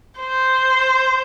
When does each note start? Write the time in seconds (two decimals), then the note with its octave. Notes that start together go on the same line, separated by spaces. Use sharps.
0.20 C5